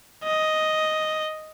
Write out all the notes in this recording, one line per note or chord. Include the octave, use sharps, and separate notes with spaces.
D#5